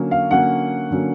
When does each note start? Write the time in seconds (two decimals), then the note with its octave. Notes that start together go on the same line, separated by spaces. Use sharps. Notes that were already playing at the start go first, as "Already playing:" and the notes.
Already playing: D3 F#3 A#3 C#4
0.11 F5
0.31 D3 F#3 A#3 C#4 F#5
0.91 D3 F#3 A#3 C#4